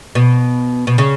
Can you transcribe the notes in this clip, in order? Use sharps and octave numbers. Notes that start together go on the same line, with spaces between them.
B2
B2
C#3